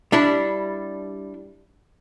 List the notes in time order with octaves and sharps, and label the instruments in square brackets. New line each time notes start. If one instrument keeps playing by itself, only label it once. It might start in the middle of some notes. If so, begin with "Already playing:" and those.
[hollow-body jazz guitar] G3 D4 E4